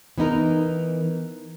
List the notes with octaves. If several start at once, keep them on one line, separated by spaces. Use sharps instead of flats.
E3 B3 D#4 A#4